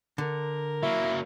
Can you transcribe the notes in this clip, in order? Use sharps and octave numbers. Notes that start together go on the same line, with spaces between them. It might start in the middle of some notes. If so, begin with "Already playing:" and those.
D3 A#4
F#3 A#3 E4